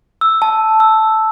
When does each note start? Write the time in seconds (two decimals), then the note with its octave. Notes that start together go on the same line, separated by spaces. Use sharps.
0.21 E6
0.42 A5
0.80 E6